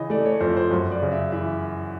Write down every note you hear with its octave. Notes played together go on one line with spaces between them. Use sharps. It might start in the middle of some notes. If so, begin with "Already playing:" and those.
Already playing: C#3 E3 D#5
A3 D5
C#5
F2 C5
C5
F#2 C#5
D5
C#3
E5
E3 E5